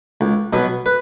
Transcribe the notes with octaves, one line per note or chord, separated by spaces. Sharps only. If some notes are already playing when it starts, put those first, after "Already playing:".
C#2
B2 F#3 B3
B4